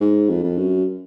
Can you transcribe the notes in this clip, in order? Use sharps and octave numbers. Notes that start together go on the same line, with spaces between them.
G#2
F2
F2
F#2